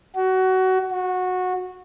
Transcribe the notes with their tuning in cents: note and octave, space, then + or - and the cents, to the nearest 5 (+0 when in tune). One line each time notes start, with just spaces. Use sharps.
F#4 +20
F#4 -15